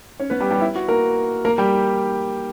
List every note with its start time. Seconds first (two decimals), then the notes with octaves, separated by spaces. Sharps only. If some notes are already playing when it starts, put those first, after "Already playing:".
0.20 C#4 C#5
0.30 B3 B4
0.40 G3 G4
0.51 G3 G4
0.61 E4
0.75 F#4
0.88 A#3 A#4
1.45 A#3 A#4
1.58 G3 G4